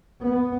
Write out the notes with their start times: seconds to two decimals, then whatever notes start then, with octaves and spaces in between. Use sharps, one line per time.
0.21 B3